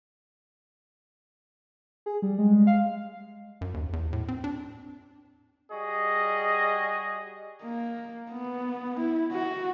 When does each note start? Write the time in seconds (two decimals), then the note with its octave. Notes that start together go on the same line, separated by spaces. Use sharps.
2.06 G#4
2.22 G3
2.38 G#3
2.67 F5
3.61 F#2
3.74 D#2
3.93 E2
4.13 A2
4.28 C4
4.44 D4
5.71 G3 F#4 G#4 D#5
7.63 A#3
8.31 B3
9.00 E4
9.32 F#4